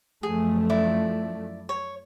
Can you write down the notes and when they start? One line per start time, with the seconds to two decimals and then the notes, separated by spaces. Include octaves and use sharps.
0.23 F#2 F3 A3 G#4
0.70 E4 D5
1.69 C#5